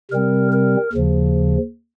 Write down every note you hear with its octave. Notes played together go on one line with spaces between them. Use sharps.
C3 G3 C4 A#4
A#4
D#2 C#3 F3